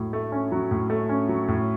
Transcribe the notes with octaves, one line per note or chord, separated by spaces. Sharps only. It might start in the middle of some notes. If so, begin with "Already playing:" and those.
Already playing: A2 F#3
A3
C#4
F#3
A2
A3
C#4
F#3
A2